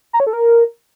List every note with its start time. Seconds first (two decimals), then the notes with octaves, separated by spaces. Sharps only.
0.13 A#5
0.20 C#5
0.27 A4
0.33 A#4